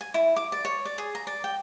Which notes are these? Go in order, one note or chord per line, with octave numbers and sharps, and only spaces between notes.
G#5
E4
D6
D5
C#5
D5
G#4
A#5
D5
G5